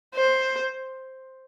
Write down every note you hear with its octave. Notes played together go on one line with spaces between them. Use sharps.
C5